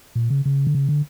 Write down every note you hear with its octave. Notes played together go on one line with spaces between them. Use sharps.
A#2
C#3
C#3
D3
C#3
D3